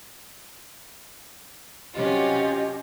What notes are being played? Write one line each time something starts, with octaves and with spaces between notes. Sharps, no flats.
C3 F#3 C#4 F4 G4 D#5